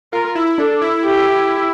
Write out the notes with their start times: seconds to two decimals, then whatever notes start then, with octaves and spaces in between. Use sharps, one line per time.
0.13 F4 A#4
0.35 E4
0.58 D4 A4
0.82 E4
1.04 G4